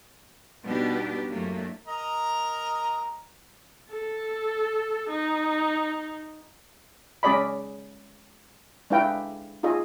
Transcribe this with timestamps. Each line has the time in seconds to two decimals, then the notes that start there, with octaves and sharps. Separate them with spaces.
0.64 B2 G3 B3 D4 D#4 G4
1.29 F#2 A2 A3 A#3 D4
1.87 A#4 D#5 A#5
3.90 A4
5.10 D#4
7.23 G#3 C#4 G#4 D5 D#5 B5
8.90 G#3 D4 E4 B4 F5 G5
9.63 D#4 F4 G#4 D#5